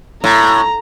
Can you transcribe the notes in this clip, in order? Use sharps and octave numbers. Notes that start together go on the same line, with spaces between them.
A2 A#5